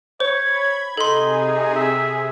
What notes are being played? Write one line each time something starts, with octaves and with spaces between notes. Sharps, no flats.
C5 C#5 B5 G#6
C3 D#4 G#4 A4 C6
E5